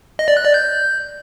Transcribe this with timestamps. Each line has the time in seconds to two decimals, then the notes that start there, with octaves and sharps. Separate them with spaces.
0.19 D#5
0.28 D5
0.37 F#6
0.45 D5
0.54 G6